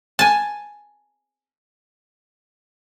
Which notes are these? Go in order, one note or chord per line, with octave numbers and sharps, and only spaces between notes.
G#5 A5